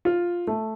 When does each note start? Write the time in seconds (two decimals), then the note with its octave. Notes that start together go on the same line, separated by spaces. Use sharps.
0.05 F4
0.47 A3